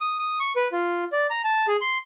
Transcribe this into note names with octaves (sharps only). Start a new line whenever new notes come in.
D#6
D#6
C#6
B4
F4
D5
A#5
A5
G#4
C6